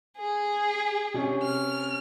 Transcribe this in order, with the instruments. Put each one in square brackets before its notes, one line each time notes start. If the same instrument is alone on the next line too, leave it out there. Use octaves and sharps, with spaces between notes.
[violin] G#4
[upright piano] C3 C#4
[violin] F6